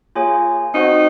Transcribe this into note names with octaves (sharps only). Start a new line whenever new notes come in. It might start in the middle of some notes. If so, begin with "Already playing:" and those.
A#3 F4 G#4 C#5 G#5
C4 D#4 F#4 C5 F#5